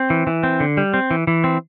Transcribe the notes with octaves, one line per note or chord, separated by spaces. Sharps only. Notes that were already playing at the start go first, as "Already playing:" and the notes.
Already playing: C4
E3
E3
C4
D3
G3
C4
E3
E3
C4